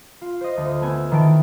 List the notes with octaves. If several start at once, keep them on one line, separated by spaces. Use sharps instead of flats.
F4
C5 D#5
D2
A3 B3 G#5 E6
D#3 E3 G5 A5 D7